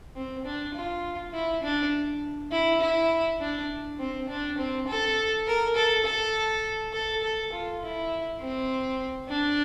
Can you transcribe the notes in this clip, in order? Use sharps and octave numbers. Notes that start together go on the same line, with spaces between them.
C4
D4
F4
E4
D4
E4
E4
D4
C4
D4
C4
A4
A#4
A4
A4
A4
A4
F4
E4
C4
D4